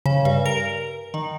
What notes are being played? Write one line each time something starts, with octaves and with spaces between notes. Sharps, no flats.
C#3
G2
A#4
D#3